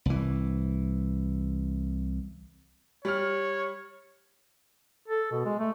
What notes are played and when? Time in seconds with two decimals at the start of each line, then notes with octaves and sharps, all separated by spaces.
0.06 C2 E3
3.05 G3 C#5 F6
5.08 A4
5.32 B2
5.45 G#3
5.59 A3